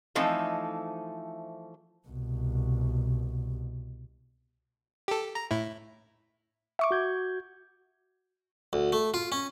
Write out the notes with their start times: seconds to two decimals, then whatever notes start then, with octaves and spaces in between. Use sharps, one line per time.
0.15 E3 F3 A3 C4 D#4 A4
2.08 C2 B2
5.08 G4 A4
5.35 A#5
5.51 A2 E4
6.79 E5 C#6 D6
6.91 F#4 G6 G#6
8.73 D2
8.92 A3
9.14 F4
9.32 C#4